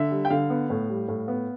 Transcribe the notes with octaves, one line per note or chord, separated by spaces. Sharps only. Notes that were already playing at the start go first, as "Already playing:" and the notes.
Already playing: D3 E5
G3
G5
D3 F5
B3
A2
G3
A2
B3